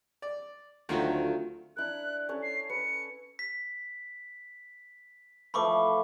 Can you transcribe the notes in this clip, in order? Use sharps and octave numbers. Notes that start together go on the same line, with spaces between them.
D5
D2 D#3 F#3 A3 C4 F4 F#4
D4 E4 A#4 F#6
C#4 A4 C#5
C7
B4 C#7
B6
E3 F3 A3 B5 C#6 D6